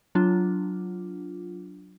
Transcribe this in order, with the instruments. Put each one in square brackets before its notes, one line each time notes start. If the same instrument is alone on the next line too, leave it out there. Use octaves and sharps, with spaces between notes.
[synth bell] F#3 D4 F4